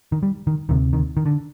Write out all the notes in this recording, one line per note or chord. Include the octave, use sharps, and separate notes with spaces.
D#3
G3
D#3
D2 C3 D#3
D#3
D#3
D3